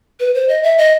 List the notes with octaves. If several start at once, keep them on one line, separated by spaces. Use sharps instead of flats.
B4
C5
D#5
E5
D#5